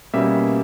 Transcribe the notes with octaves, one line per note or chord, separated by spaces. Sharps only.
B2 G3 A#3 C#4 E5